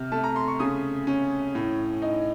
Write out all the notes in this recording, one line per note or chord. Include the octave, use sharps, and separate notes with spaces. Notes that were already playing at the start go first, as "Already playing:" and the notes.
Already playing: C3 F6
A3 A5
A#5
C6
C#6
C#3 D#6
C#4
A2
D#4